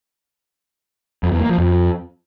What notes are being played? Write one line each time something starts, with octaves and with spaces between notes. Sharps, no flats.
F2
E2
A#3
F3
F2